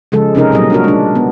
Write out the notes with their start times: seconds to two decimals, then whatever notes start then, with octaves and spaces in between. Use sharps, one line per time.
0.12 C#3 F3 G#3 A4
0.35 C3 C#4 D#4 A#4
0.52 A#2 F#3 G3 D#5
0.70 D4 F#4 A#4
0.84 G#3 D4
1.15 B3